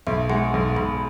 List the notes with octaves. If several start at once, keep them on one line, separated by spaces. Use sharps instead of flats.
B1 E5
G#3 F#5
B1
B1 B5